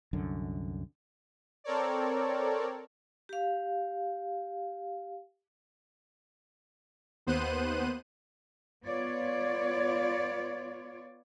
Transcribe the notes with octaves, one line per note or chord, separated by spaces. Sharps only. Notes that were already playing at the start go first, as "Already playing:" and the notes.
C2 F#2 D3
C4 A4 A#4 C#5 D5
G4 F5
D#2 B3 C5 F#6 D#7
B3 F4 C#5 D5